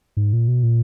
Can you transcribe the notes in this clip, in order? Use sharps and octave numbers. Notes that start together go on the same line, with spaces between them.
G#2
A#2
B2
A#2